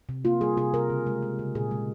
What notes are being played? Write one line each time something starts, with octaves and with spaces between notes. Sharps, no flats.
C3
A#3 F4
G3 G#4
C3 G#4
C3 A#4
C#3
G#3
G#3
C#3
A#2 G#4
G#3